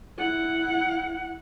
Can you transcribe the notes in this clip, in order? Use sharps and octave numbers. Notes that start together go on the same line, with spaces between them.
E4 F#5